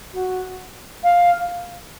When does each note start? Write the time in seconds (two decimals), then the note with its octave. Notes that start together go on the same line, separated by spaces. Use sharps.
0.14 F#4
1.04 F5